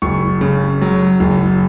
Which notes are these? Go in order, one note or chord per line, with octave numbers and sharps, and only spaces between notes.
F#1 C#6
C#3
F#3
F#1